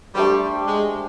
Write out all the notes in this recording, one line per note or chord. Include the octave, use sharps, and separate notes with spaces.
G3 A3 D4 G4 C5
G#3